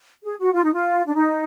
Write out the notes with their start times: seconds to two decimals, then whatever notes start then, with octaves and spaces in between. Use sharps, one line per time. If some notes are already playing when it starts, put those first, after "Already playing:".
0.24 G#4
0.39 F#4
0.54 F4
0.63 D#4
0.73 F4
1.07 D4
1.14 D#4